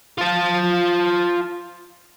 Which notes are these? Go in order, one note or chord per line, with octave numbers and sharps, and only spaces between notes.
F4 A5